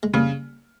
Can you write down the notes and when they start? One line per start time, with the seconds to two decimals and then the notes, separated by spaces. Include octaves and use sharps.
0.03 G#3
0.13 C#3 G3 A#3